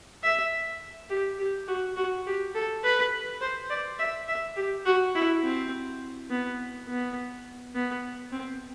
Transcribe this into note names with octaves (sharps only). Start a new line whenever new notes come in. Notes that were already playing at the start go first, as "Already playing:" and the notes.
E5
G4
G4
F#4
F#4
G4
A4
B4
C5
D5
E5
E5
G4
F#4
E4
C4
B3
B3
B3
C4